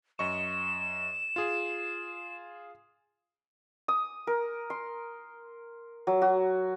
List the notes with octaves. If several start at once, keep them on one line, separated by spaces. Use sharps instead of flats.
F#2 D#5 C#6 E7
F4 G#4
D#6
A#4
C6
F#3
F#4